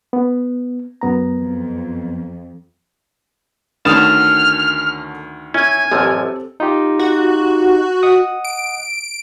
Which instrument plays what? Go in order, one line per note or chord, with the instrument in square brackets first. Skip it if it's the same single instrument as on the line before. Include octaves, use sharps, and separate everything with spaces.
[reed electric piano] B3
F#2 B3 A#5
[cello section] F2
[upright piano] D2 D#3 D#6 [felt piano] D3 A3 C#4 [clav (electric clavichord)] A5 [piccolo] F6
[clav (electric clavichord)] C#4 [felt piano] E4 [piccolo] G#5
[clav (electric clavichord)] A1 F#2 F3 [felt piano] C4 G4 A4
[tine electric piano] D#4 F4 G4
[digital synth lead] F#4
[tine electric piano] D#5 F#5 D#6
[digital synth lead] D7